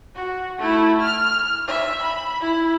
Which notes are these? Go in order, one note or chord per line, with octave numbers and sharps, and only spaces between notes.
F#4
A3 E4
F6
E5
B5
E4